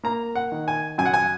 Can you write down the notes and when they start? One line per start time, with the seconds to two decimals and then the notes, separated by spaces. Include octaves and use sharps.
0.04 A#3 A#5
0.35 F#5
0.52 D#3
0.68 G#5
0.98 F#2 G#5
1.05 F#5
1.14 G#5